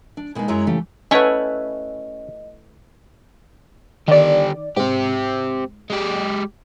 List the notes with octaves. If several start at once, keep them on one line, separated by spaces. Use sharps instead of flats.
D4
B2 G#3 A#3 B3 D#4
F#2 F#3 G#3 E4 C#5 A#5
C#3 E3 A3 G4
A3 C#4 E4 B4 C#5 D#5 F#5 G#5
D3 D#3 G4 D5
G#2 C4 G4
G#3 G4